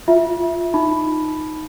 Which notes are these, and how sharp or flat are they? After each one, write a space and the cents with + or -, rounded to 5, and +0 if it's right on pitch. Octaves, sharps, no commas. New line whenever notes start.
F4 +0 E5 +0
D#4 +0 B5 +0